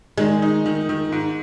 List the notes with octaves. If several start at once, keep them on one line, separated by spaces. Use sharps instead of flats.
D#3 G#3
D#4
D#3
D#3
G#2